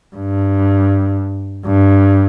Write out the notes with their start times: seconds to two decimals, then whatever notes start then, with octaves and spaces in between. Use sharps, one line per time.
0.15 G2
1.66 G2